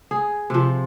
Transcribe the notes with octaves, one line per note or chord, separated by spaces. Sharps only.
G#4
C3 F3